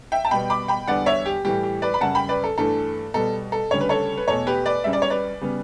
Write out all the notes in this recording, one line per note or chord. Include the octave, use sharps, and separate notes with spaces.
E5 G5
A5
B2 G3 B3 G5 B5
B5 D6
G5 B5
E2 D3 G3 B3 D5 F#5
C#5 E5
G4
A2 E3 G3 G4
G4
B4 D5
B5
F#2 C#3 G3 F#5 A5
G5 B5
B4 D5
A4
G2 E3 A3 A4
B2 G3 B3 A4
A4
D2 C#3 G3 C#5
B4
A4 C#5
B4
E2 B2 A3 A4 C#5
G4 B4
B4 D5
C#2 C#3 G3 E5
D5
C#5
B4 D5
C#3 G3 B3